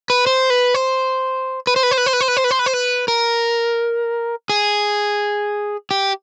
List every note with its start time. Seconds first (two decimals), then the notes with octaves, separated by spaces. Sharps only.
0.10 B4
0.27 C5
0.50 B4
0.74 C5
1.67 B4
1.76 C5
1.83 B4
1.91 C5
1.98 B4
2.06 C5
2.13 B4
2.21 C5
2.28 B4
2.37 C5
2.44 B4
2.51 C5
2.59 B4
2.66 C5
2.73 B4
3.08 A#4
4.49 G#4
5.91 G4